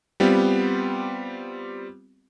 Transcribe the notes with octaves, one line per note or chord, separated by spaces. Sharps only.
G3 B3 C4 F4 G4